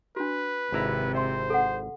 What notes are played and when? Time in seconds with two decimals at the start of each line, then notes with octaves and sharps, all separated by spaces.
0.16 D4 F#4 B4
0.73 G#1 C3 E4 A#5
1.15 C5 E5 C6
1.50 A4 F#5